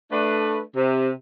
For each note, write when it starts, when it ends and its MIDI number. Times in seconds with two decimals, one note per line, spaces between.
0.11 0.60 57
0.11 0.60 62
0.11 0.60 71
0.76 1.10 48